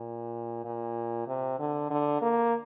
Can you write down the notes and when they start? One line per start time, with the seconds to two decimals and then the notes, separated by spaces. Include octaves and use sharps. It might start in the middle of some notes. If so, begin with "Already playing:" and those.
Already playing: A#2
0.64 A#2
1.28 C3
1.59 D3
1.90 D3
2.22 A#3